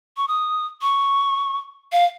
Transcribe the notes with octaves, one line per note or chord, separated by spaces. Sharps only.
C#6
D#6
C#6
F5